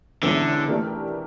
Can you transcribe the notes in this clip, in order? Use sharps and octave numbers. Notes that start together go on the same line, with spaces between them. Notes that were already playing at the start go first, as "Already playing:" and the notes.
E2 B2 D3 G#3 C#4 E4
E3 A3 D4 G4 A#4